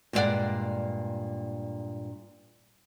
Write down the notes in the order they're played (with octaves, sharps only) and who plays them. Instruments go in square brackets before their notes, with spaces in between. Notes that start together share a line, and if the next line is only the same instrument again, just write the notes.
[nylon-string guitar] G2 A#2 G#3 E4 D5 F#5